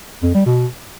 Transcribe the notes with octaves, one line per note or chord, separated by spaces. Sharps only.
F2
G3
B2